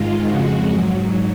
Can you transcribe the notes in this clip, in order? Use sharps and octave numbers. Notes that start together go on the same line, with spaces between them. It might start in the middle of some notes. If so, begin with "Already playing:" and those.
Already playing: G#2 D#3 G#3 F4
F2 C#3 G#3 F#4
G#2 F#3